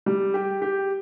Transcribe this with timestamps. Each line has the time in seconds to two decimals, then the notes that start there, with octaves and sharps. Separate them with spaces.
0.06 G3
0.34 G4
0.62 G4